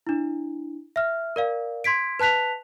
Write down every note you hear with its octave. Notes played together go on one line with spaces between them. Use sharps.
D4 E4
E5 F6
A#4 D5 F5
C6 G#6 B6 D7
B4 A5 F#6 B6 F7